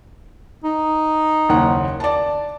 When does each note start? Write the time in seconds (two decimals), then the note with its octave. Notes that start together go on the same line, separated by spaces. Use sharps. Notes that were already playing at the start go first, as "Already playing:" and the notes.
0.64 D#4
1.49 F#1 D#2 F#5
2.00 D5 A5